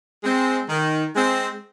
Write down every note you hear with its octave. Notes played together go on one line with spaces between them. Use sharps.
G#3 C4
D#3
G#3 C4